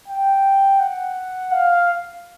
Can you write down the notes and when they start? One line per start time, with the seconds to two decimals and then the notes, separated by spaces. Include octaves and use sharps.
0.08 G5
0.80 F#5
1.52 F5